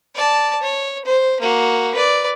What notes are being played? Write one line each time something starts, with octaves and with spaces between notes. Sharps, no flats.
D5 A5
C#5
C5
A#3 F#4
B4 D5